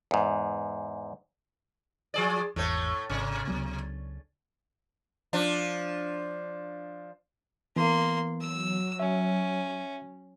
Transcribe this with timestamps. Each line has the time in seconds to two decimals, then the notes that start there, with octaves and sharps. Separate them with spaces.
0.11 E2 G#2
2.14 F3 G#4 D5
2.56 G#1 E2 A2 A3 C#5
3.10 G#1 C3
3.48 C#2 F#3 B3
5.33 F3 D4
7.76 E3 A#3 B3 C6
8.41 F#3 E6
9.00 C#4 E5